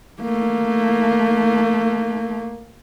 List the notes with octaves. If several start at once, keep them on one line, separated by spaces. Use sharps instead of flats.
A3 A#3